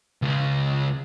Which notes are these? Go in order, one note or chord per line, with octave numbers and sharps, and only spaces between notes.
C#2 C#3